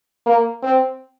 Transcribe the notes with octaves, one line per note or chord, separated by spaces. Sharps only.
A#3
C4